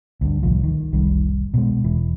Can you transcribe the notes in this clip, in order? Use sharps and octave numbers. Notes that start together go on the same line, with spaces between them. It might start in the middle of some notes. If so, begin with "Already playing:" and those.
D2 G2
D1 C2 F3
D#3
F1 C2 D#3 G3
B2 G#3
E1 E3